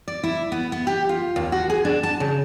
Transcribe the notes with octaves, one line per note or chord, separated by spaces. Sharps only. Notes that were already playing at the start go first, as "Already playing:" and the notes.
D5
E4
B3
B3
G4
F4
D#2
F#4
G#4
D4
A5
C#3